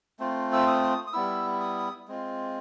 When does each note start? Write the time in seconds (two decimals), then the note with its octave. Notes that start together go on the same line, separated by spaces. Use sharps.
0.19 A3 C4 F4
0.53 E6
0.67 D#6
1.07 D#6
1.13 G3 B3 E4 E6
1.60 D#6
2.08 G#3 C4 F4